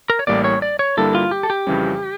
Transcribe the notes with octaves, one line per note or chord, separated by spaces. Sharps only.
A#4
C#5
A1 A2 G3 A#3 D5
C#5
D5
C#5
G2 D3 G3 A#3 E4 A4
F4
G4
A4
G4
F2 C#3 E3 G3 C#4